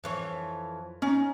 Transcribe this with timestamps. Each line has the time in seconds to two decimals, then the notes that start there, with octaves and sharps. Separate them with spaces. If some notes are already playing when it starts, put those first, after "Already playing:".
0.04 F2 E3 C#5
1.02 C#4 D#4